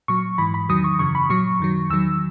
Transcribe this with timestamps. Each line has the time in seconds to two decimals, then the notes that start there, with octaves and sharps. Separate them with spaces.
0.08 A#2 F#3 C#6
0.38 G#2 E3 B5
0.54 B5
0.69 E2 D#3 F#3 D#6
0.84 C#6
0.99 F#2 C#3 E3 C#6
1.15 B5
1.30 A#2 F#3 C#6
1.60 F#2 D#3 F#3
1.90 E2 D#3 F#3 E6